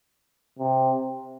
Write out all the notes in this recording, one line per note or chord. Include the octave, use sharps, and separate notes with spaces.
C3